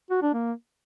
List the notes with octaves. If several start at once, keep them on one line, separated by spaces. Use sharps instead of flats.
F#4
D4
A#3